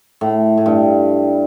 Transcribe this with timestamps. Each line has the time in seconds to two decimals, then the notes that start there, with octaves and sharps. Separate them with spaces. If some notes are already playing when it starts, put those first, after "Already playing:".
0.21 A2
0.58 A2
0.66 G2